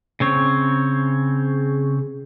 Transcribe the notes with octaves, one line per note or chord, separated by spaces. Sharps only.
C#3 C4 C#5